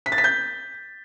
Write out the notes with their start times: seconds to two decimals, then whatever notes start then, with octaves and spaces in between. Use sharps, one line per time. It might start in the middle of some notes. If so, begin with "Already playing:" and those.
0.06 B6
0.12 A6
0.18 B6
0.24 G6